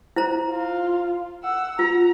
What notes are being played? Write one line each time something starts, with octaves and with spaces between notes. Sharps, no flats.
E4 C5 A#5
F4
F#5 E6
F4 A#5